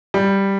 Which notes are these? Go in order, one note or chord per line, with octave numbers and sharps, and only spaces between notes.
G3